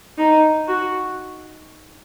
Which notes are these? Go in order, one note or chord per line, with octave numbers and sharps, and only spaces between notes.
D#4
F#4